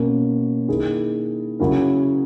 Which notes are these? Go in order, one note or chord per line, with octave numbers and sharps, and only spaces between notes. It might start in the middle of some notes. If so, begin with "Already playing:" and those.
Already playing: B2 A#3 C#4
D#3 A#3 E4 G#4
C#3 F#3 C#4 E4 A#4